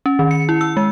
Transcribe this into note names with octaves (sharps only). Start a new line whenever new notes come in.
C#4
D#3
C#7
E4
E6
G#3